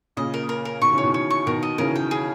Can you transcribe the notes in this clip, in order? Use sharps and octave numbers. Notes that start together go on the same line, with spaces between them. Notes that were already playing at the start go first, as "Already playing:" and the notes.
A#2 C#3 D#5
A#4
A#4
A#4
B2 D#3 C#6
C#3 E3
C#5
B2 D#3
C#5
C#6
B2 D#3 A#4
D#5
C#3 E3 A#4
G5
G#4